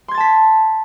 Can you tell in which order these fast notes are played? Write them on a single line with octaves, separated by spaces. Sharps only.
C6 G#6 A6 A5 B6